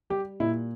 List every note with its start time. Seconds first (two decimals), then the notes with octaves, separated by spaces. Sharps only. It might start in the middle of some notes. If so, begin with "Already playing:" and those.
0.10 G3 G4
0.40 A#2 E4